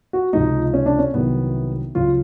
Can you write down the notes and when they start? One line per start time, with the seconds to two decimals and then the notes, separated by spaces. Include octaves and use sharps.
0.13 F#4
0.33 C#2 C3 F3 G#3 D#4
0.74 C#4
0.86 D4
0.99 C#4
1.14 C2 C3 D#3 F#3 B3
1.95 C#2 C#3 F#3 F4